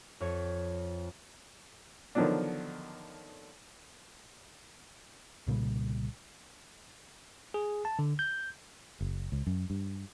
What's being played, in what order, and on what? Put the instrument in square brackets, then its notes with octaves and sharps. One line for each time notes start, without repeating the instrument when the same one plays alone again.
[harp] F2 C#5
[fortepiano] D3 D#3 F3 F#3 B3 D4
[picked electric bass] C2 A#2 C#3 G3
[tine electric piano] G#4
A5
D3
G6
[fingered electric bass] F#1
C#2
F#2
G2